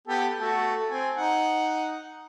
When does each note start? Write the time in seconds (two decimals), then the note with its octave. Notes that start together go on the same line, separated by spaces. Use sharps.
0.07 B3 G4 A4
0.40 A3 F#4 A4
0.90 C4 G#5
1.16 D#4 F#5